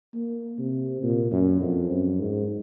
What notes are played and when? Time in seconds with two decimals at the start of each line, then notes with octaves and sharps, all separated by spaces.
0.14 A#3
0.58 C3
1.03 A#2
1.32 F#2
1.61 F2
1.90 F#2
2.20 G#2